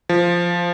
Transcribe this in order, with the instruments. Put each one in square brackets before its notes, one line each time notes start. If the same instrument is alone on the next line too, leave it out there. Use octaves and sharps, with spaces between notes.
[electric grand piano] F3